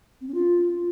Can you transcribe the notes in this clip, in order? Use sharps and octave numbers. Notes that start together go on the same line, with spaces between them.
C4
C#4
F4